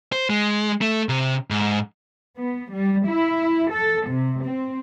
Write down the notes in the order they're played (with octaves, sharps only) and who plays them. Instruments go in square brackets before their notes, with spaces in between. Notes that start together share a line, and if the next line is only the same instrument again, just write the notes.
[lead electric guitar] C5
G#3
A3
C3
G#2
[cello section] B3
G3
E4
A4
C3
C4